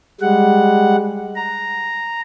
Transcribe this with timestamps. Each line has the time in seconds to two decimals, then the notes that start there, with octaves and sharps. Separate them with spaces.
0.21 G3 G#3 F#5
1.36 A#5